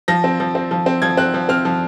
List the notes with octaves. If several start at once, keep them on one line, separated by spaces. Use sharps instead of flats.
F3 A#6
C4
F3
C4
F3
C4
F3 G#6
C4 F#6
F3
C4 F6
F3